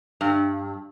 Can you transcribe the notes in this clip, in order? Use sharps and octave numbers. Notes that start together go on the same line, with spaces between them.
G2